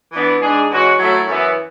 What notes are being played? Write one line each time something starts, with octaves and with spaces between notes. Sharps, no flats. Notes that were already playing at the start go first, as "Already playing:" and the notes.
E3 B3 D4
G#2 G#3 D4 G#4
E3 G#3 C#4 F#4
F#3 A3 E4
F#2 E3 B3